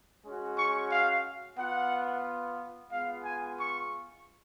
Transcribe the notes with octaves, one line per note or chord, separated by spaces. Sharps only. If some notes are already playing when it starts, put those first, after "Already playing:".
G#3 C#4 F#4
C#6
F5
B3 F4 F#5
G#3 B3 F4 F5
G#5
C#6